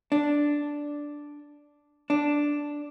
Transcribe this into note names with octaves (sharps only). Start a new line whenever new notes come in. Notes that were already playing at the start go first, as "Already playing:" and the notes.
D4
D4